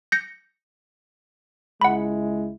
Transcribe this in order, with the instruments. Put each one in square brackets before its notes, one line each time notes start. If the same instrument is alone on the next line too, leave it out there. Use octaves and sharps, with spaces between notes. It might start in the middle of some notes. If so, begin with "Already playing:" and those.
[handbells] G6 A#6 C#7
[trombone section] C#2 G#3 E4 [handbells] F#5 B5